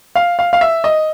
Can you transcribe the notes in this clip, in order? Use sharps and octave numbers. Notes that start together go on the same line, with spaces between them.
F5
F5
F5
E5
D#5